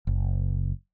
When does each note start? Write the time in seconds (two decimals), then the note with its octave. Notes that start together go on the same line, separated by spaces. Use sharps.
0.07 F#1